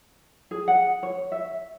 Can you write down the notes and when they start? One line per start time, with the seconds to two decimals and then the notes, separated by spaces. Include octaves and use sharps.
0.51 G#4
0.68 F#5
1.03 C#5
1.32 E5